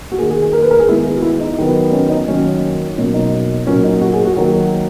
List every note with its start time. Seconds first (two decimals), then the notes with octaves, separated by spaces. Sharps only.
0.11 F#4
0.18 D#3 A#3 G#4
0.30 G#4
0.42 G#4
0.53 A#4
0.62 B4
0.71 A#4
0.79 G#4
0.89 D#3 G#3 B3 E4
1.05 G#4
1.15 F#4
1.22 E4
1.40 D#4
1.58 D#3 F#3 B3
1.92 C#4
2.10 D#4
2.27 D#3 F#3 A#3 C#4
2.98 B2 F#3 A#3 C#4
3.14 D#4
3.67 A#2 F#3 A#3 C#4
3.84 D#4
4.01 F#4
4.13 G#4
4.25 F#4
4.36 D#3 F#3 A#3 F#4